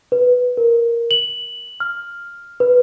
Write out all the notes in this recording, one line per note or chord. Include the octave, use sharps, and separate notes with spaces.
B4
A#4
F#7
F6
B4